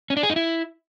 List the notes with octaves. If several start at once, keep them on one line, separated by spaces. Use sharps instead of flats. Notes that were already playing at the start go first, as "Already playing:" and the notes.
C#4
D4
G#4
D#4
E4